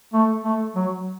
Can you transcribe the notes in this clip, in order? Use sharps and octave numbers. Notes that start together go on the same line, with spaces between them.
A3
A3
F#3